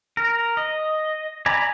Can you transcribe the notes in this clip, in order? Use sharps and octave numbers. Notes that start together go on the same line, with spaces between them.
A#4
D#5
D5 G#5 A#5 B5